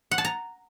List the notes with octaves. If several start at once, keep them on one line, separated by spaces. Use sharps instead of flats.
F#5
A5
A#5